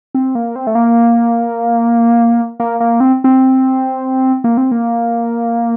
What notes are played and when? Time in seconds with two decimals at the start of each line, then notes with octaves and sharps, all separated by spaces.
0.15 C4
0.35 A#3
0.56 C4
0.67 A3
0.75 A#3
2.60 A#3
2.80 A#3
3.00 C4
3.24 C4
4.44 A#3
4.57 C4
4.72 A#3